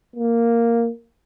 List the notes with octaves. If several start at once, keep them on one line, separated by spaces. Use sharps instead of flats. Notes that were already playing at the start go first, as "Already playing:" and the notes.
A#3